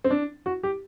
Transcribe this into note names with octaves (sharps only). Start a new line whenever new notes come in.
C4
D4
F#4
G4